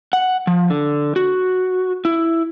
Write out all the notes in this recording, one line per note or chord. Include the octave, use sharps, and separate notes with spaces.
F#5
F3
D3
F#4
E4